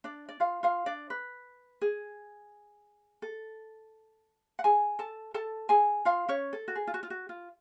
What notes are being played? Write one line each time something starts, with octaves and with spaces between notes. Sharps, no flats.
D4 D5
D5
F4 F5
F4 F5
D4 D5
B4
G#4
A4
F#5
G#4 G#5
A4 A5
A4 A5
G#4 G#5
F4 F5
C#4 C#5
A4
F#4
G#4
F4
F#4
F4
F#4
F4